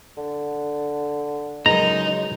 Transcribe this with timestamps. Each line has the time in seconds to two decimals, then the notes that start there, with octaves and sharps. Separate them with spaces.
0.17 D3
1.66 C#2 F#2 G#3 D#4 A#5